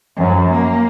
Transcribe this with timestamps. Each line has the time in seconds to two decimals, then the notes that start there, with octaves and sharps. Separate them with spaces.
0.17 F#2 F3
0.49 A#3